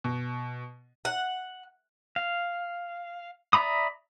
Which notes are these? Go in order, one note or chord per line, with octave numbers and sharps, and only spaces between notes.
B2
F#5
F5
D5 E5 A#5 B5 D#6